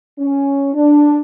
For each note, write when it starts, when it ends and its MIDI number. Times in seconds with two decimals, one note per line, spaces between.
0.19 0.69 61
0.74 1.20 62